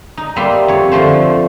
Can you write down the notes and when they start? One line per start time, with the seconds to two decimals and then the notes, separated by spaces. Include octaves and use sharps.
0.17 D#4
0.36 G3 A#3 B3 E5 C6
0.68 F2 C#5
0.92 D3 F3 A3 C5